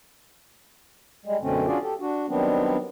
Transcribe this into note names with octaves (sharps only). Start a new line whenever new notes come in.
G3 G#3
F#2 B2 D3 A3 C4 C#4
C#4 D4 F4 F#4 G#4 D5
G4 A4
D4 F#4
D#3 F#3 G3 B3 C4 D4